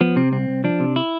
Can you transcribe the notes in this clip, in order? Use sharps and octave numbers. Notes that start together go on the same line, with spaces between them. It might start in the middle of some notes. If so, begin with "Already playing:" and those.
F3 B3
C3 C4
C2 C4
C2
F3 D4
C3
E4